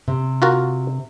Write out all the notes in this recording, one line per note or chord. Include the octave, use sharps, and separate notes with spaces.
C3
F4 F#4 A#4